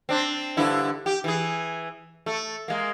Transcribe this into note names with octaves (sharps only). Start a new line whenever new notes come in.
C4 D4
G2 D3 E4
G4
E3 G#4
A3
G#3 A#3